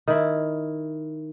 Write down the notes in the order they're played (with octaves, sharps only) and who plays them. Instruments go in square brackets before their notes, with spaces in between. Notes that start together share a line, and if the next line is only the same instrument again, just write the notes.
[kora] D#3 E4